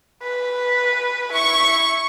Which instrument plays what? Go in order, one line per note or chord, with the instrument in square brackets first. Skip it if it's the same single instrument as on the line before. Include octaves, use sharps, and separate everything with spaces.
[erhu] B4
[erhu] E4 [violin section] C#6